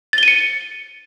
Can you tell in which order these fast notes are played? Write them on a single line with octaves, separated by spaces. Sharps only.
A6 G7 D#7 C#7